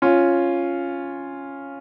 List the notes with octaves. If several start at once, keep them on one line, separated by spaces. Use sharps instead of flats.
C#4 F4